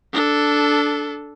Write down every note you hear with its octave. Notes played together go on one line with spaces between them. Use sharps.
D4 A4